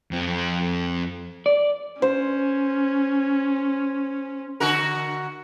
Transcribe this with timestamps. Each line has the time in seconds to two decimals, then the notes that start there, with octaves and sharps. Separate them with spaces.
0.11 F2 C4
1.46 D5
2.02 C#4 C5
4.60 D3 F#4 A#4